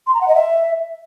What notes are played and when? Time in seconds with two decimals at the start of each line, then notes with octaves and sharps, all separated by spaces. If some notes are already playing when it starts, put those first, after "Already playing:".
0.07 C6
0.14 A#5
0.21 F#5
0.28 D#5
0.35 E5